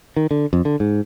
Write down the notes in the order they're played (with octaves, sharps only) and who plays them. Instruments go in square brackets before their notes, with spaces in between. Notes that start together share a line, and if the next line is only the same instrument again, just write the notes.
[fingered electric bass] D#3
D3
F2
D3
G#2